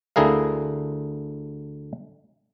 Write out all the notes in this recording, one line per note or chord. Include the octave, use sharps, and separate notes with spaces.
D2 D3 E4 G#4 A#4 F5